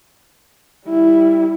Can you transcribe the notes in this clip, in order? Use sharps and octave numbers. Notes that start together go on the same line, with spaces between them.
G3 E4